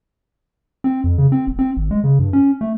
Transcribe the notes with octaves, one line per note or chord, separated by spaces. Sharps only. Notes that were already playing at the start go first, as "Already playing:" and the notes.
C4
F2
C#3
C4
E1
C4
G#1
G#3
C#3
G2
C#4
A3